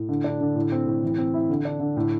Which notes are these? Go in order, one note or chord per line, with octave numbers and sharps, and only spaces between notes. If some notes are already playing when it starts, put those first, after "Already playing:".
Already playing: A2
D3
D4
D3
A2
C4
A2
E3
C4
E4
D3
D4
D3
A2